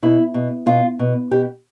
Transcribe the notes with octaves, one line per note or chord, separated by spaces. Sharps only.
B2 E4
B2
B2 F4
B2
B2 G4